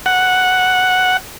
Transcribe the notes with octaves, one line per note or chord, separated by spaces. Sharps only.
F#5